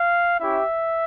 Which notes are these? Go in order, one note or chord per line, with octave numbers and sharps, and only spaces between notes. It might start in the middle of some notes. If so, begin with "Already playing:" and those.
Already playing: F5
C#4 E4 G4 E5